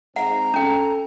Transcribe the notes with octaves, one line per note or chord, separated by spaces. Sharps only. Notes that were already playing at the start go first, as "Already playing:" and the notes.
G#2 C4 F#5 A#5
C#4 A4 G5